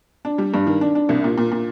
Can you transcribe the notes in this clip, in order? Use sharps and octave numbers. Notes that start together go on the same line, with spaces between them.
D4
G3
G2
D#3
D4
D4
C2
A#2
A#2
A#2